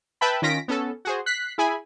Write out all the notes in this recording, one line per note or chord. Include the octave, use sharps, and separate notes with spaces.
B4 E5 G5 A5 B5
D#3 C#4 F4 A#6 B6 D7
B3 C#4 A4
F#4 G#4 C5
F#6 B6 C7
E4 G#4 G#5 B5